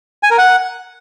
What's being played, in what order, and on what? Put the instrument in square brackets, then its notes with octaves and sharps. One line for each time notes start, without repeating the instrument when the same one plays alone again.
[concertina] G#5
A#4
F#5